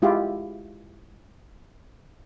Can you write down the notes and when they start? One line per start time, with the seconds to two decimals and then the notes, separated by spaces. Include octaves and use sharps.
0.02 G#3 E4 F4 G4